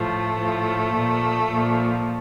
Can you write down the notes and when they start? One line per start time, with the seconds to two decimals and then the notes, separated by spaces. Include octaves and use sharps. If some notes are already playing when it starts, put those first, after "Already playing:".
Already playing: A2 F3 A3
0.37 A2 F3
0.93 A#2 F3
1.49 A#2 F3